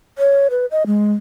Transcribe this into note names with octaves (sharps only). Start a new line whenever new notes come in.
C#5
B4
D#5
G#3